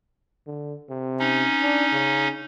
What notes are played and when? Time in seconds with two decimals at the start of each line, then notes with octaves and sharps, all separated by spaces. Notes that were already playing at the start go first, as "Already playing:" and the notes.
0.47 D3
0.90 C3
1.19 C#4 D#4
1.62 D4
1.93 C#3